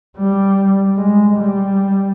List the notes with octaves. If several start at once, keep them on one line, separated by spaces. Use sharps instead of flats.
G3
G#3
G3